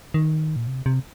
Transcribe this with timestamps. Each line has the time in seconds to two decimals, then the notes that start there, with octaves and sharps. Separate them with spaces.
0.14 D#3
0.56 A#2
0.67 C3
0.86 C3